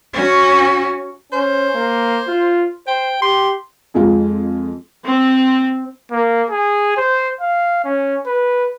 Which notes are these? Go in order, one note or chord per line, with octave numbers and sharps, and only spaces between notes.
C#4 F#4
C#4 C5
A#3
F4
C5 G5
G4 C6
F2 G#3 F4
C4
A#3
G#4
C5
F5
C#4
B4